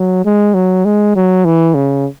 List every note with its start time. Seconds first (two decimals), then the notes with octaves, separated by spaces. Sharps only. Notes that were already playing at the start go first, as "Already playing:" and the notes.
Already playing: F#3
0.25 G#3
0.54 F#3
0.85 G#3
1.15 F#3
1.45 E3
1.74 C#3